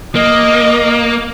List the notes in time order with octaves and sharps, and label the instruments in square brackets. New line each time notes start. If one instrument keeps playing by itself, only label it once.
[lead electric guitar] A#3 [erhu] D#5